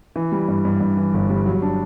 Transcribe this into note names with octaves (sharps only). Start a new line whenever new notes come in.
E3
G3
G2
G2
G2
E3
G1
G3
F#3
D4